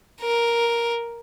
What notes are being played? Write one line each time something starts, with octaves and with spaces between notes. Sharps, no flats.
A#4